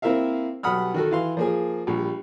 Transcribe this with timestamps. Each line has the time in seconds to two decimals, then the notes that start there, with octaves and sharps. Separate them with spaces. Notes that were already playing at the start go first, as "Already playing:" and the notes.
0.02 A#3 C4 E4 A#4 E5 F5
0.63 B1 G3 F#5 B5 D#6 F6
0.94 D#3 F#4 A4
1.11 E3 F5 C6
1.37 F3 A#3 G#4
1.87 A#1 G3